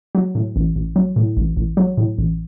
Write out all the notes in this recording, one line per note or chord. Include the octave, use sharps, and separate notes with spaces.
F#3
A2
A1
A1
F#3
A2
A1
A1
F#3
A2
A1